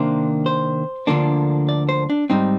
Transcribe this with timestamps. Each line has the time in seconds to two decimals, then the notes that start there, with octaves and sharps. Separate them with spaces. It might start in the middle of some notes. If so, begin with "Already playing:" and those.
Already playing: C3 D#3 A#3 D4 C5
0.46 C5
1.07 D2 D3 F3 A#3 D4
1.69 D5
1.89 C5
2.10 D4
2.30 G#2 G3 C4 D#4